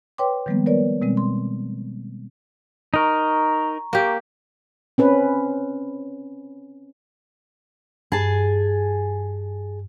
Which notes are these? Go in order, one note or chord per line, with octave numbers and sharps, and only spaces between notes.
B4 C#5 G5 C6 D6
D#3 F3 G3 G#3 A#3 B3
G3 B3 A#4 B4 C#5 D5
B2 G3 G#3 C4
C6
D#4 A#4 A#5 C#6
A#3 G4
C4 C#4 B4
G2 G#4 G#5 A5